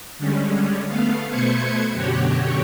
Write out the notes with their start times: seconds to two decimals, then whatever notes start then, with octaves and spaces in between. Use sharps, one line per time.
0.18 D3 G3 G#3 C#4
0.87 A3 B3 F5
1.29 B2 A3 B4 C5 G#6 C#7
1.92 F#2 B2 D3 F#4 G4 C#5